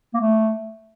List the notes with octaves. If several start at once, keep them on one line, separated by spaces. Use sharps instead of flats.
A#3
A3